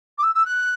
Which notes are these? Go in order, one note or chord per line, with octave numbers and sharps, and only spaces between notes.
D6
E6
E6
F#6